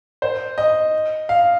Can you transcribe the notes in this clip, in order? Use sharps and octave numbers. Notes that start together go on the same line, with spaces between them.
C5
D#5
F5